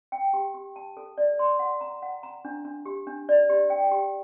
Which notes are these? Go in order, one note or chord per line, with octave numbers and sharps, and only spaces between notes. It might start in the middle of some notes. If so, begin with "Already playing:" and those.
G5
G4
G4
A5
A4
D5
C6
F#5
A#5
F#5
A#5
D4
D4
G4
D4
D5
G4
G5
G4